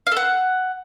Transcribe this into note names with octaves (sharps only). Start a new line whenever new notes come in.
F5
A4
F#5